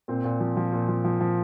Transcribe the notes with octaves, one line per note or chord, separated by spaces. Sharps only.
A#2 C4
A#2
F3
F3
A#2
F3
F3
F3